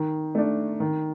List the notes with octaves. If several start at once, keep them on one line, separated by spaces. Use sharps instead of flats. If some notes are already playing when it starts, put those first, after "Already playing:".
Already playing: D#3
A3 D4
D#3